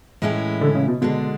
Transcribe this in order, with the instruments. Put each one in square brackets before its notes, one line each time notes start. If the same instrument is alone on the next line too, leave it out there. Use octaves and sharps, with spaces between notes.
[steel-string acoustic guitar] A2 E3 G#3 C#4 E4
[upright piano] D3
C#3
B2
[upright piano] B2 [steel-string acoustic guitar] D3 G#3 D4